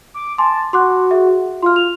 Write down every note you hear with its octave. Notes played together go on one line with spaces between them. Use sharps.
D6
G#5 A5 C6 D6
F#4 C6 D6 F#6
G#4 E5
F4 C6 F6
F7